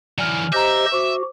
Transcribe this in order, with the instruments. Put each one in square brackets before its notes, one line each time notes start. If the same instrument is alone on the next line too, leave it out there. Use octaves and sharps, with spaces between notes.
[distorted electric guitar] E3 F#3 [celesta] D5 G#5 F6
[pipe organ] G4 C5 D#5 [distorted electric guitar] E5 [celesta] A#5 G6
[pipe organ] F#4 [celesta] C5 D6